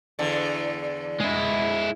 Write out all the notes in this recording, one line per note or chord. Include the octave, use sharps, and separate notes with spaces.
E2 D3
G#3 E4